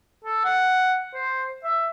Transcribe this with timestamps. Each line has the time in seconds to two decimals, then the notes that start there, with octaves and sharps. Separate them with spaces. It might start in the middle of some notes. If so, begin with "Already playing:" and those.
0.24 A4
0.45 F#5
1.14 C5
1.64 E5